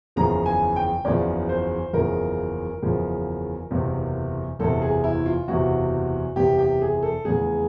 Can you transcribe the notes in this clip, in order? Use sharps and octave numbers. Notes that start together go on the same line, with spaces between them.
F#1 E2 C#3 F3 A#5
G#5
G5
F#1 E2 C#3 F3 D5
C5
F#1 E2 C#3 F3 A#4
F#1 E2 C#3 F3
F#1 E2 C3
F#1 E2 C3 A4
G#4
E4
F4
F#1 E2 C3 F#4
F#1 E2 C3 G4
G4
G#4
A4
F1 E2 C#3 G#4